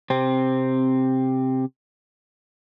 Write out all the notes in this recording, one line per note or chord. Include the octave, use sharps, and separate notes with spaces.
C3 C4